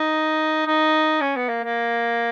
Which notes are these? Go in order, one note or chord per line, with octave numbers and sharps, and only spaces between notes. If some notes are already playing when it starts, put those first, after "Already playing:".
Already playing: D#4
D#4
C#4
B3
A#3
A#3